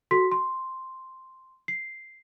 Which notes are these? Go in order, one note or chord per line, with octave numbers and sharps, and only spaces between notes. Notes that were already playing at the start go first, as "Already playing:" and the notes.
F#4 A4 C6 B6
C6
C7